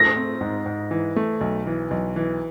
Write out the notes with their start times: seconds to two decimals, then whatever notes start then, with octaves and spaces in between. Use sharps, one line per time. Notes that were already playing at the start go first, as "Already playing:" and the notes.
Already playing: A3 A#6
0.16 C4
0.41 G#2
0.66 G#2
0.91 E3
1.16 A3
1.41 B1
1.67 E3
1.91 B1
2.16 E3